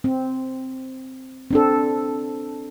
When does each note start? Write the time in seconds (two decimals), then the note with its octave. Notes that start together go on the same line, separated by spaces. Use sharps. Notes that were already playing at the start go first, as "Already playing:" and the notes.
0.04 C4
1.51 C4 D4 A4